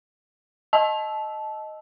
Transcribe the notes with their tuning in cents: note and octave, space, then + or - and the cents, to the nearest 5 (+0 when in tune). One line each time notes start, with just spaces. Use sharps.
D#5 +0 A5 -20 E6 +0